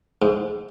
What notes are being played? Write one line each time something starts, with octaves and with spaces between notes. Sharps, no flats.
G#2